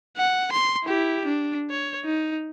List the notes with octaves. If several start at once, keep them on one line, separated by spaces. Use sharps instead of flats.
F#5
C6
E4 G4
D4
C#5
D#4